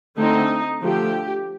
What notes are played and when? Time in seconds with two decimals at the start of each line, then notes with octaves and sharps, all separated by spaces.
0.17 D3 A3 C4 D#4
0.83 D3 F3 A3 G4